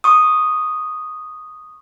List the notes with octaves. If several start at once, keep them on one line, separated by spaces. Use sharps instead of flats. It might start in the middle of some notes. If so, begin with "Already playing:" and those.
C#6 D#6